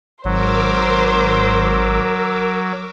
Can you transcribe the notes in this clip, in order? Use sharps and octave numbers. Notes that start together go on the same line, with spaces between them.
G#1 F#3 A#4 C5 D6 E6